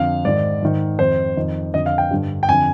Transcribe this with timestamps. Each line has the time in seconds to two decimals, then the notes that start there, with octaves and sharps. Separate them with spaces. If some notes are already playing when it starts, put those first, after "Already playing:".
Already playing: F2 D3 F5
0.25 G#2 D#3 D5
0.62 G#2 D#3
0.99 F2 D#3 C5
1.37 F2 D#3
1.73 F2 D3 D#5
1.86 F5
1.98 G5
2.11 G2 D3
2.43 G5
2.48 F2 D3 G#5